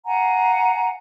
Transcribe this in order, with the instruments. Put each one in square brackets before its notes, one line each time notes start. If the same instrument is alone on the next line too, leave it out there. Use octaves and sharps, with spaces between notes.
[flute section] F5 F#5 G#5 A#5